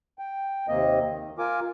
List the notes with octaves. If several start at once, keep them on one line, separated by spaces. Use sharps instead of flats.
G5
D#2 C3 A#3 C4 D#5
D#3
F4 A#4 G#5 D6